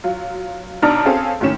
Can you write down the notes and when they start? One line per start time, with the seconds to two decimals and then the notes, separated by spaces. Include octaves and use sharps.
0.04 F#3 F4
0.82 B1 D4 D#4 A5 A#5 F6
1.05 C4 C#4 G#4 A4 F5 A5
1.40 F#1 A2 D#3 C#4 E7